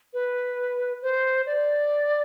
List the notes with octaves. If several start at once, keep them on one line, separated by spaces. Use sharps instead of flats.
B4
C5
D5